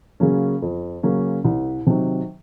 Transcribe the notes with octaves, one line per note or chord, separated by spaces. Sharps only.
C#3 F#3 A#3 C#4
F2
C#3 F#3 A#3 C#4
C2
C3 D#3 F#3